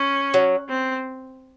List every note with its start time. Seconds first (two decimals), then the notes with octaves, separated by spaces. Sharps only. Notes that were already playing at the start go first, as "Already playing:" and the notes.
Already playing: C#4
0.34 F#3
0.68 C4